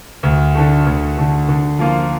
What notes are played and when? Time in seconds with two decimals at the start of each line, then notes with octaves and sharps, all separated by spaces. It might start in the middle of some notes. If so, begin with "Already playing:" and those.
0.23 D2
0.55 D3 A3
0.86 D2
1.17 D3 A3
1.48 D3
1.79 F3 A#3 F4